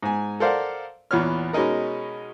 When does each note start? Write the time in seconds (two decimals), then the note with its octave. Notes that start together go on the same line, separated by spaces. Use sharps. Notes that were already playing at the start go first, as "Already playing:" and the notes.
0.03 G#2 G#5
0.40 A4 A#4 C5 D5 F5 F#5
1.11 E2 A#2 B3 C#5 F6
1.53 B2 G#3 C#4 D#4 A#4